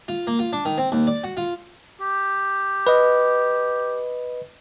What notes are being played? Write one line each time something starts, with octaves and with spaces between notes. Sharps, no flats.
F4
A#3
F4
D4
D#3
C4
D#2
D5
F#4
F4
G4
B4 D#5